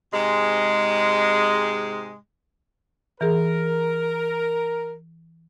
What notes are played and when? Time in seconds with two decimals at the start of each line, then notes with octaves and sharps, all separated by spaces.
0.12 G#2 C3 G#3
3.21 E3 G#4 A#4